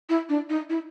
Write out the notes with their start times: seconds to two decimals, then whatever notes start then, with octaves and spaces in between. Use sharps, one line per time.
0.09 E4
0.29 D4
0.50 D#4
0.70 E4